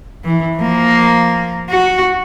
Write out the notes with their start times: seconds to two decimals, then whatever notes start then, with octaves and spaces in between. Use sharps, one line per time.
0.24 E3
0.57 F3 A#3
1.70 F#4